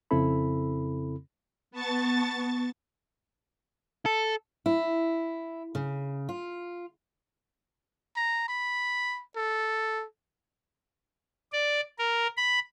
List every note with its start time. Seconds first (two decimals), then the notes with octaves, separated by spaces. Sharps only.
0.11 F2 C#3 C4 E4 A4 B5
1.71 B3 A5 C#6 A6
4.06 A4
4.66 E4
5.75 C#3
6.29 F4
8.16 A#5
8.48 B5
9.36 A4
11.53 D5
11.99 A#4
12.37 B5